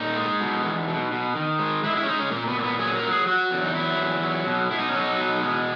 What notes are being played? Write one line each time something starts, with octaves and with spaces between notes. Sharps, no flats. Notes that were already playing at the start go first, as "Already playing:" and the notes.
Already playing: A#2 D#4
G#3
B2
E2
B2
B2
D#3
G#3
G#3 E4
E4
C#4
G#3 D#4
C#4
A#2 A#3
B3
A#2 A#3
B3
F#3 G#4
A#4
F#3
G#4
F#3 F#4
E2
D#4
F#3 E4
E2
F#3
B2
B2 E4
D#4
C#4
F#3 D#4
B2
G#3